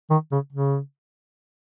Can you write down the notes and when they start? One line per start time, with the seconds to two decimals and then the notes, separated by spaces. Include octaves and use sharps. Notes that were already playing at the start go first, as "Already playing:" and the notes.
0.10 D#3
0.32 C#3
0.53 C#3